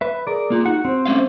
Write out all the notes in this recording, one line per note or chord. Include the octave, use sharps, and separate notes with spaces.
B4 E5
G#4 A#4 D5
A#3 F4
D#4 F#4 F#5
C4 C5
A3 C#4 F5